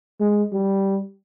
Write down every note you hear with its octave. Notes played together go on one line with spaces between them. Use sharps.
G#3
G3